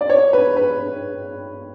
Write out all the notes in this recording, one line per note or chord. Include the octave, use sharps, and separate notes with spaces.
D5
C#5
B4
B4